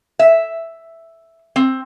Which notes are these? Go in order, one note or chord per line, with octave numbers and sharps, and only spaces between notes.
E5
C4